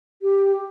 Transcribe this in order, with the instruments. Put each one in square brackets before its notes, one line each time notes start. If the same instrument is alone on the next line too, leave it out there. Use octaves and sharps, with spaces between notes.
[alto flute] G4